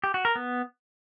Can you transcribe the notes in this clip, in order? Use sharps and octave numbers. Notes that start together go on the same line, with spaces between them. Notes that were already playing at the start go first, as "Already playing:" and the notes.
G4
F#4
A#4
B3